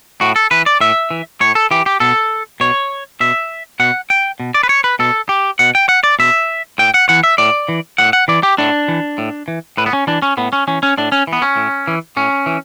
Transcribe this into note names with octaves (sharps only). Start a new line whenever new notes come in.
A2 F#4
A4
E3 B4
D5
A2 E5
E3
A2 C#5
A4
E3 G4
G4
B2 A4
B2 C#5
B2 E5
B2 F#5
G5
B2
D5
B4
C#5
B4
B2 A4
G4
B2 F#5
G5
F#5
D5
B2 E5
A2 G5
F#5
E3 F#5
E5
A2 D5
E3
A2 F#5
F#5
E3 D5
G4
A2 D4
E3
A2
E3
A2 B4
B3
C#4
E3 D4
C#4
A2 B3
C#4
E3 C#4
C#4
A2 D4
C#4
E3
B3
C#4
A2
E3
A2 C#4
E3